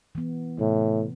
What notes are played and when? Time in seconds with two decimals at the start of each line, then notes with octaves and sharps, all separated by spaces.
0.15 E3 B3
0.59 A2 C3